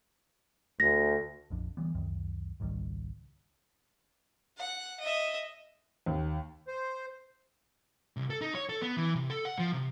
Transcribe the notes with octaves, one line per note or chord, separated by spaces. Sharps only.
D2 A#6
A#1 F2 D4
D3 E3 G3 B3
C#2 F#2 D#3
G#1 C#2 D#3 G3
F#5
D#5 E5
D#2
C5
C2
A4
D#4
C#5
A4
B3
E3
C3
A4
F#5
F3
C3